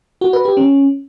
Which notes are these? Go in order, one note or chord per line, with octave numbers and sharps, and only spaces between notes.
F#4
B4
G4
C#4